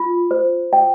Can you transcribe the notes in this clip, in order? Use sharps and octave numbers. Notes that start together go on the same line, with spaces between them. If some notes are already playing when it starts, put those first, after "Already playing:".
Already playing: F4
C5
G5